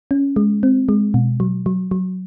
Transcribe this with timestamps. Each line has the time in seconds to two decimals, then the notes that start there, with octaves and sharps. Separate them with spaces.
0.11 C#4
0.36 G#3
0.63 C4
0.89 G#3
1.14 B2
1.40 F#3
1.66 F#3
1.91 F#3